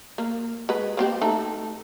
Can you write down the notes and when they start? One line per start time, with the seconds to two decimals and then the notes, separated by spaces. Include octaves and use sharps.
0.18 A#3
0.69 G#3 B4
0.97 A#3 C4 G4
1.21 A3 D#4 A4